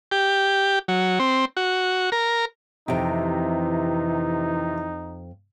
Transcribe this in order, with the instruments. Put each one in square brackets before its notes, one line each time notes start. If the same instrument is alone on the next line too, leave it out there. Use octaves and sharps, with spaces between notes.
[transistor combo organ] G4
F#3
C4
F#4
A#4
[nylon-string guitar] F2 G5 [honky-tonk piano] C3 [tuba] E3 [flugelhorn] D#4